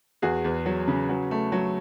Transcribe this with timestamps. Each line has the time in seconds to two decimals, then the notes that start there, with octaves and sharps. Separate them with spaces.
0.22 E2 F#4 G#4
0.44 E2
0.66 F#3
0.87 C#3
1.09 F#3
1.31 A3
1.52 F#3